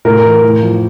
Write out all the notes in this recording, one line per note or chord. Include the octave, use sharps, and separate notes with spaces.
A2 A#4
E3
A2
F3